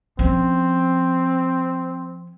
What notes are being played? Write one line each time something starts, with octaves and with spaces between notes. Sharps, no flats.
F3 C4 C#4